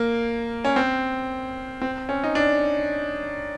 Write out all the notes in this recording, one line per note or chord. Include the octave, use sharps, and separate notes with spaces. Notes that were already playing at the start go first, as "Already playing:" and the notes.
Already playing: A#3
C#4
C4
C4
C#4
D#4
D4